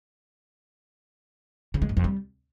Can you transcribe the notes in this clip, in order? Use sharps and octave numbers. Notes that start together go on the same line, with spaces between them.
C#3
G#3
F#2
F2
G3